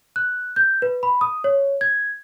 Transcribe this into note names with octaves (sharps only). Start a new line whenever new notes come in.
F#6
G6
B4
B5
D#6
C#5
G#6